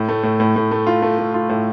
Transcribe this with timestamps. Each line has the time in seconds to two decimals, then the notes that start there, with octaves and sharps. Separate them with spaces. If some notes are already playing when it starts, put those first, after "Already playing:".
Already playing: A2
0.09 A3
0.23 A2
0.40 A2
0.56 A2
0.71 A3
0.87 F4
1.02 A3
1.18 A3
1.34 F4
1.49 A2